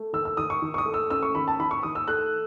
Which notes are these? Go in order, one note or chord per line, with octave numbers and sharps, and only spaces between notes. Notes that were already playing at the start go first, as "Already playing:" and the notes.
Already playing: A3
D#3 E6
E6
D#3 D#6
C#6
D#3
C#6
D#6
A3
E6
C#4 E6
C#6
D#3 B5
A5
D#3 B5
C#6
D#3 D#6
E6
A3 F#6